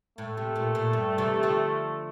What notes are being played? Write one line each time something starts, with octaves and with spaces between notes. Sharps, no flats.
A2 A3
C3
A#2
A#2
G2
C3 E3
D3 F3